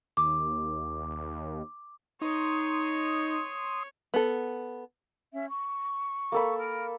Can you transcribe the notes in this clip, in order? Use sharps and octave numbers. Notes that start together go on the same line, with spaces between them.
D#2 D6
D#4 C#5 C6 D#6
B3 A4
C#4 E5
C#6
A#3 A4 B5
A#4